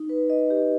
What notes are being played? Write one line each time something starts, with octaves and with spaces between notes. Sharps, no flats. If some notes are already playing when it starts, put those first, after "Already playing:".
Already playing: D#4
B4
D#5
G4